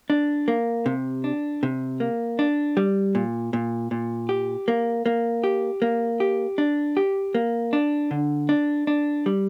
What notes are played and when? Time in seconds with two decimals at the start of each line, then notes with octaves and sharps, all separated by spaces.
0.10 D4
0.48 A#3
0.86 C3
1.24 D4
1.63 C3
2.00 A#3
2.39 D4
2.77 G3
3.15 A#2
3.53 A#2
3.91 A#2
4.29 G4
4.68 A#3
5.06 A#3
5.44 G4
5.82 A#3
6.20 G4
6.58 D4
6.97 G4
7.35 A#3
7.73 D4
8.11 D3
8.49 D4
8.87 D4
9.26 G3